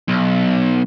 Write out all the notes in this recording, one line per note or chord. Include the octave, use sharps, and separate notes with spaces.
B1